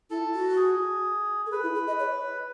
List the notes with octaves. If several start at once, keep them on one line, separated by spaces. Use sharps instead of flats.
E4 A4
F#4
G#4
A4
G#4 B4
E4
G#4
D#5
C#5